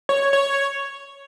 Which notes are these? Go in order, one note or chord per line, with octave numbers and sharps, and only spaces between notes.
C#5
C#5